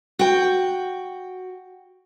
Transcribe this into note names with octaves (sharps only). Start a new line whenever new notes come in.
F#4 G5